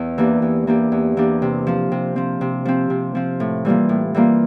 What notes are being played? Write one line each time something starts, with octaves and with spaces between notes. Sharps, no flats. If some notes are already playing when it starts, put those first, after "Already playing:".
Already playing: E2
E3 A#3 D4 G4
E2
E3 A#3 D4 G4
E2
E3 A#3 D4 G4
C3
F3 C4
C3
F3 C4
C3
F3 C4
C3
F3 C4
A2
E3 G3 A#3 F4
A2
E3 G3 A#3 F4